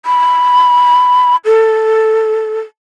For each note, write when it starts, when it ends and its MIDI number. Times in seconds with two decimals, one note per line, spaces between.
0.06 1.36 83
1.45 2.60 69